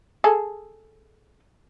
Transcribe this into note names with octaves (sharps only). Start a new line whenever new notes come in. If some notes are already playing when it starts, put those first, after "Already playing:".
G#4 A4